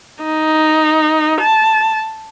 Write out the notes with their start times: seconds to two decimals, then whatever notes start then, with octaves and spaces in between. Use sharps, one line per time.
0.23 D#4
1.41 A5